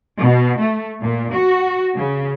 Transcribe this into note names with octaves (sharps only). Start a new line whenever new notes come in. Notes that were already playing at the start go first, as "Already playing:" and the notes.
B2
A3
A#2
F#4
C#3